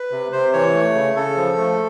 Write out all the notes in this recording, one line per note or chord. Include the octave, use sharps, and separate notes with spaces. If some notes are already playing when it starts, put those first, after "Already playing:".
Already playing: B4
C3
C3 C5
E3 C#5
A3
C#3
C#3 A4
F3
A3